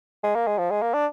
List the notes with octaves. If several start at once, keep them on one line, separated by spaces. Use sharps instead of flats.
G#3
A#3
G#3
F3
G#3
A#3
D4